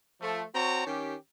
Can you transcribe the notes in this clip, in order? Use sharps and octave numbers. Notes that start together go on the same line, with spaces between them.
F3 A3
C4 F#4 C#5 A5 A#5
D#3 C#4 G4